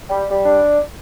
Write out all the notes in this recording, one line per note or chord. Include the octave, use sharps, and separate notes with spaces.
G3
G3
D4